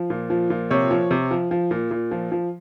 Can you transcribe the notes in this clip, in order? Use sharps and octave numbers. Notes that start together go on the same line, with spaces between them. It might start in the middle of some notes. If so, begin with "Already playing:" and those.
Already playing: F3
A#2
F3
A#2
C3 C#5
F3
C3
F3
F3
A#2
A#2
F3
F3